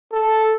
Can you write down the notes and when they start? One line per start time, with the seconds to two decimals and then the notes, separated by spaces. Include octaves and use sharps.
0.12 A4